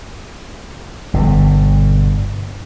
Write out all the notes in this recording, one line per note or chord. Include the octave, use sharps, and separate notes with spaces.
G1 B2 D3